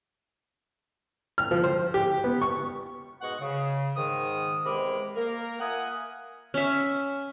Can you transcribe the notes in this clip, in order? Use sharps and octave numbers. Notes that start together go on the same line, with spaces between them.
F6
F3
C5
G4
B3
C#6
G#2 B2 D#5 F#5 C#6
C#3
G#2 D#3 D#6
E2 C3 G#3 A#4 B5 D6
A#3 A#4
F4 A#4 E5 F#5 G#5 D#6
C#4 E5